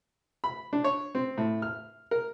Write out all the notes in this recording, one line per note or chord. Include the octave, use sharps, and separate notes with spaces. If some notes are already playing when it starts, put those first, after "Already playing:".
B5
D4
C#5
C4
A2
F6
A#4